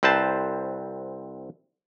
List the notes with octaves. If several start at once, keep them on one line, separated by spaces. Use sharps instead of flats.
C2 C4 B4 C5 A5